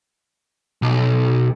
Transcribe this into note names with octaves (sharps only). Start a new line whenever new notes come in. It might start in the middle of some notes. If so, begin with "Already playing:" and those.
B1